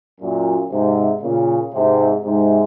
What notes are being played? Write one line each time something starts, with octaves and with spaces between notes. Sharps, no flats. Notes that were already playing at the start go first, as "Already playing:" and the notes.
F#2 A#2
G#2 C3
A#2 C#3
G#2 C3
G#2 C3